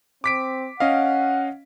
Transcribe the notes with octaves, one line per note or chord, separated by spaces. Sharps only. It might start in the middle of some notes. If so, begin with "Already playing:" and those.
C4 D6 B6 D7
C#4 D#5 F5 F#5